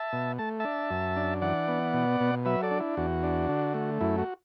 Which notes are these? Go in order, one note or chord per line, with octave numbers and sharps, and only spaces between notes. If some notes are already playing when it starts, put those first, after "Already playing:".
Already playing: E5 A5
B2
A3 A5
D4 E5 A5
F#2
D4
E3 D5 F#5
B3
B2
B2
F#3 B4 E5
A4 D5
D4
E4
E2 F#4
D4
D3
A3
F#2 E4
F#4